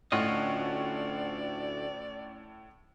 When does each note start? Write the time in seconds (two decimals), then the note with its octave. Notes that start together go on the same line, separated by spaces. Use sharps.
0.12 D2 A2 C#4 F4 D5 D#5 F#5